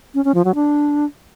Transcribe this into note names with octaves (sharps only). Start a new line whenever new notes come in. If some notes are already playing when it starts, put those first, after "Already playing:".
C#4
C#4
F3
F#3
D4